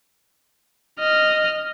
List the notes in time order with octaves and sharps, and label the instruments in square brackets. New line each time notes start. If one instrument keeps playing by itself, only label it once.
[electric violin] D#5 F6